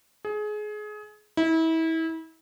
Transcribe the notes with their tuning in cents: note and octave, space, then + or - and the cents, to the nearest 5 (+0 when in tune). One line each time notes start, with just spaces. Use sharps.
G#4 +25
E4 -30